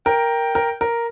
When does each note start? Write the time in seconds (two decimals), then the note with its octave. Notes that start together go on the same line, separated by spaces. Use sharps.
0.06 A#4 G5
0.55 A#4
0.81 A#4